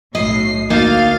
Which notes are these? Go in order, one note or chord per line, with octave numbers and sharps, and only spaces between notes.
B1 A2 D#5 C7
D2 A#3 D#4 F4 F5 A6